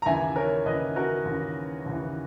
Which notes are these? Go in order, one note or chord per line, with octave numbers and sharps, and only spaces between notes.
A#5
D#2 C#3 E3 E5 G#5
A#4 C#5
D#2 C#3 E3 B4 D#5
F#4 A#4
D#2 C#3 E3
D#2 C#3 E3